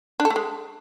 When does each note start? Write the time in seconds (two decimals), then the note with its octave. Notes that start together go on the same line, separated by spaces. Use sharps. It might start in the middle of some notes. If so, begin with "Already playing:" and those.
0.20 D4
0.25 A4
0.30 A3
0.36 G#3